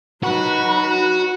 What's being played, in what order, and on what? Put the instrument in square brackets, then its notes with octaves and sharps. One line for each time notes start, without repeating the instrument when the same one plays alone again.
[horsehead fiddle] F#3 D#4 [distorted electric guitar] F#4 [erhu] B4